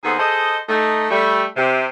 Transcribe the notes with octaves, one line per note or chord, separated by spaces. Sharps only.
D#2 D#3 B3 G#4 A4 C5
G#4 A4 C5 D#5
A3 D#4
G3 A3
C3